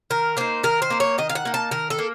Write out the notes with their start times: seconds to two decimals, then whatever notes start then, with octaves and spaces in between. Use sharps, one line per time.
0.10 D#3 A#4
0.37 A#3 D#4 C5
0.63 D#3 A#4
0.82 C5
0.90 A#3 D#4
1.00 C#5
1.18 D#3 D#5
1.29 F5
1.35 F#5
1.45 A#3 D#4
1.54 A5
1.71 D#3 A#4
1.90 A4
1.99 A#3